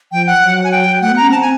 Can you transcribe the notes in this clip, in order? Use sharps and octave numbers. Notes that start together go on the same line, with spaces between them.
F3 G5
F#5
F#3
G#5
G5
A3 F#5
B3
C#4 A#5
C4 A5
G#5